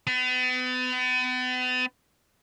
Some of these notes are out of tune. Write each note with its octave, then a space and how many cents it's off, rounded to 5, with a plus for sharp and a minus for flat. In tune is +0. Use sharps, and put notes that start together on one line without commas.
B3 +40